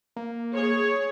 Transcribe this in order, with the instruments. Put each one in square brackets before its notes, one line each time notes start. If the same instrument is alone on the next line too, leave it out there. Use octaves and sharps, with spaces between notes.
[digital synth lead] A#3
[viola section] G#4 C#5